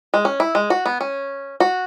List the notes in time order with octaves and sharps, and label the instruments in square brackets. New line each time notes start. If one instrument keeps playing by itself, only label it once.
[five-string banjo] G#3
C#4
E4
G#3
F#4
B3
C#4
F#4